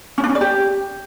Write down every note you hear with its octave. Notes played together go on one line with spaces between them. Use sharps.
C#4
D4
C#4
D5
G4